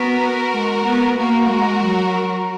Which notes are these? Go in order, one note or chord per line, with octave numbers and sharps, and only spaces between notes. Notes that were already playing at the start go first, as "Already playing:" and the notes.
Already playing: B3 F#4 A#4
G#3
B3
A#3 F#4 A#4
G#3
F#3